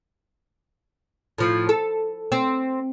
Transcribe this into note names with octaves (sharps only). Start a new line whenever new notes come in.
A2 F3
A4
C4